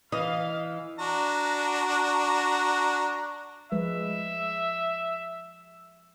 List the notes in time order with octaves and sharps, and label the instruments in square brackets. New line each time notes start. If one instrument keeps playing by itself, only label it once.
[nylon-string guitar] E3 [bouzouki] D#5 [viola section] F5
[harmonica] D4 F#4 A#5
[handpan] F3 G#3 B4 [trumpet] E5